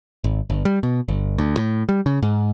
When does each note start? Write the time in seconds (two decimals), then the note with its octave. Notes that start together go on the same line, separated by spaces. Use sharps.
0.24 G#1
0.50 G1
0.65 G3
0.83 B2
1.08 G1
1.38 D2
1.57 A2
1.89 G3
2.06 C#3
2.22 G#2